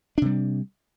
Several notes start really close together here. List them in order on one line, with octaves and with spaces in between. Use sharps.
D4 C3 G3